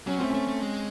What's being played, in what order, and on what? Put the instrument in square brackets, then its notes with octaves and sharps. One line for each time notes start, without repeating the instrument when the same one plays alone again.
[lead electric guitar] F#3 [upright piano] C#4
[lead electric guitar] A3 [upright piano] C4
[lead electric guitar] A3 [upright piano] C#4
[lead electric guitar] A3
G#3